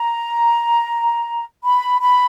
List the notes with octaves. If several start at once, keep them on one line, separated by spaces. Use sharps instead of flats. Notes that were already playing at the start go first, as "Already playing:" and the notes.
Already playing: A#5
B5
B5